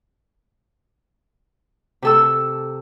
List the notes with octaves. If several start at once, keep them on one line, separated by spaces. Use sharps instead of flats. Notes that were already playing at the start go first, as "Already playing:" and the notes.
C3 A4 E6